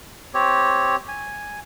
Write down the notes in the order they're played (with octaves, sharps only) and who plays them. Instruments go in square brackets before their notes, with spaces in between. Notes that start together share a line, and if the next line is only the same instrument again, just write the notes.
[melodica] C4 G4 C#5
G#5